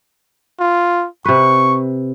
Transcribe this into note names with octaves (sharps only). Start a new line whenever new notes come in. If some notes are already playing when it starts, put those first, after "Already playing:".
F4
C3 B4 C#6